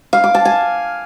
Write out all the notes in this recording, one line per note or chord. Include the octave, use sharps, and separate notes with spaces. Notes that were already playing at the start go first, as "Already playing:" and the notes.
F5
D6
A5
G#5